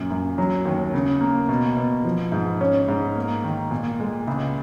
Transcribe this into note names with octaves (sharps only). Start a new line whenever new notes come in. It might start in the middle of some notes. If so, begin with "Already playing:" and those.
Already playing: F#2 A#2
F#2
F#3
D#2
C#3
A#3
B2
B2
F3
G#2
C#4
G#2
A#3
D#3
A#2
G#3
C#2